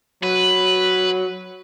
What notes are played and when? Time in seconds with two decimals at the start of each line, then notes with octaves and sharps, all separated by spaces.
0.23 F#3 B4